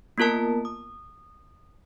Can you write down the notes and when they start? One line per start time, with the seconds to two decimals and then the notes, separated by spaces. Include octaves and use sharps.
0.18 A#3 B3 F4 A#4 A5
0.65 D#6